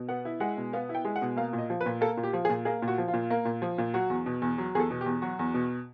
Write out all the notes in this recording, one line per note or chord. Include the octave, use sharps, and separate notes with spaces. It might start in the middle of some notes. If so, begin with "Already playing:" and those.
Already playing: B2
B3 F#5
E4
G#3 F#5
B2
B3 F5
E4
G5
G#3
F#5
B2
A#3 F5
A#2
D#5
F3
B4
A#2
A#3 A4
A#2
G4
F3
G#4
A#2
A#3 G#4
A#2
F#4
F3
F4
A#2
A#3
A#2
F3
A#2
F#3 F#4
E2
B2
E2
F#3
E2 G#4 A4
B2
G4
E2
F#3 F#4
E2
B2